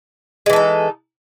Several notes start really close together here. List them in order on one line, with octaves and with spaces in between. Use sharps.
G#3 E3 A4 D#4